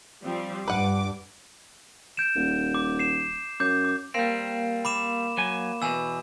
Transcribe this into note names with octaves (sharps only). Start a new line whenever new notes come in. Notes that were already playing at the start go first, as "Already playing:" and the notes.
F3 G3 C4
G2 B4 F#5 D6
G6 D7 E7
D#1
D6
C7 E7
F#2 D6 G6
D6
G3 A#3 C4 A#4 F5
B5 D6 E7
F#3 G#5
E2 B2 G#5 E6